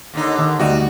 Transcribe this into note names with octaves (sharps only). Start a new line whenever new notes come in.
D#2 D3 D#4
D#3
D2 G3 D#4 F#4